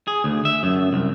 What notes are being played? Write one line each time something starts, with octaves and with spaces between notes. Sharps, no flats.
G#4
D2
E5
F#2
C2